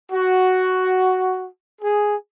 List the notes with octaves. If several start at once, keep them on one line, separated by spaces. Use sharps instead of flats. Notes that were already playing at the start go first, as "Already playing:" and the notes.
F#4
G#4